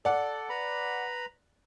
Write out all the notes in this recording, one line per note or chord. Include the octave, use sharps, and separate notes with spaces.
A4 D5 F#5
B4 A#5 B5